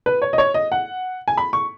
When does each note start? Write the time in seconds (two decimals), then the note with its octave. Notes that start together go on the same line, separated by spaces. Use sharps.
0.06 B4
0.22 C#5
0.33 D#5
0.38 C#5
0.54 D#5
0.72 F#5
1.28 G#5
1.37 B5
1.53 C#6